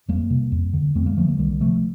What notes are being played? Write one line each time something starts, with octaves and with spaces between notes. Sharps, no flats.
F2 G3 A#3
C3
F2
D3
F2 A3 C4
G3 A#3
D3 F3 A3
G3 A#3
C2 D#3 G3
C3 F3 A3